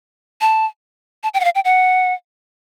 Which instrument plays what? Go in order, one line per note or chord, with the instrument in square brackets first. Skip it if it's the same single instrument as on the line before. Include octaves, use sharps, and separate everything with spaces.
[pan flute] A5
A5
G5
F#5
F5
G5
F#5